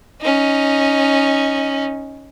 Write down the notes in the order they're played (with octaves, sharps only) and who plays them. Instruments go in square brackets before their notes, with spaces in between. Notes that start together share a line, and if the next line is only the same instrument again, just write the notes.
[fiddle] C#4 D#4